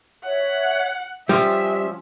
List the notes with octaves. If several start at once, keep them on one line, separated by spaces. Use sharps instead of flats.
C#5 E5 F#5
F3 G3 C#4 E5